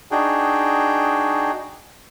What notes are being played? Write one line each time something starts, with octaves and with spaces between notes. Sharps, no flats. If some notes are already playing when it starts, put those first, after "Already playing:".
D4 D#4 F#4 G#4 G5